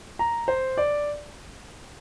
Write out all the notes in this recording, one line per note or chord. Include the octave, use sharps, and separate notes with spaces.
A#5
C5
D5